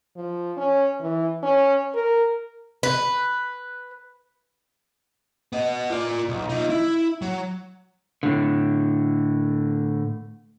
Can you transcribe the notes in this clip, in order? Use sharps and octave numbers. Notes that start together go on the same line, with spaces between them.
F3
C#4
E3
C#4
A#4
B4
B3 D#5
F4 D5
B1
D#4 F4
E4
F#3
A2 D3